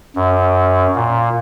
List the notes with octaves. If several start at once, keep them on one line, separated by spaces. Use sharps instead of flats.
F#2
A#2